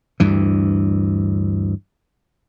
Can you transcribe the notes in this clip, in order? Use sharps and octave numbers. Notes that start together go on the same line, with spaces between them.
D2 G2 E3